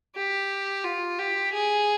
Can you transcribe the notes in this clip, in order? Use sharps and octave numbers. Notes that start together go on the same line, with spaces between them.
G4
F4
G4
G#4